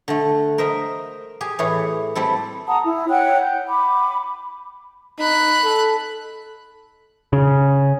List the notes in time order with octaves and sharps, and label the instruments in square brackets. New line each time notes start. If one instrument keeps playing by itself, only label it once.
[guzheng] D3 A3
A#4 C5 D#5 E5
G4 G#4 G#5
A2 E3 E4 G#4 C#5
G3 C4 E4 A4
[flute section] F#5 A5 A#5 D#6
E4
C#5 F#5 G5 F#6
G6
B5 D6
[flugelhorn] D#4 [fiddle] B5 F#6
[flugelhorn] A4
[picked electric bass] C#3